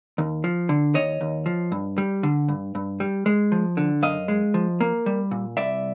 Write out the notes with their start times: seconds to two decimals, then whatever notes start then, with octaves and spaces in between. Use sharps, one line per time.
0.18 D#2
0.44 F3
0.69 D3
0.94 D#2 C#5 D#5
1.21 D#2
1.46 F3
1.72 G2
1.98 G3
2.23 D3
2.48 G2
2.75 G2
3.00 G3
3.26 G#3
3.52 F3
3.77 D3
4.02 F#2 D#5 F5
4.28 G#3
4.54 F3
4.81 A#3
5.06 G3
5.31 A#2
5.57 C2 D5 E5